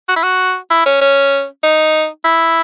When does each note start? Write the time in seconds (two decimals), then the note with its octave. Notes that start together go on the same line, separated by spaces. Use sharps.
0.08 F#4
0.16 E4
0.23 F#4
0.70 E4
0.86 C#4
1.01 C#4
1.63 D#4
2.24 E4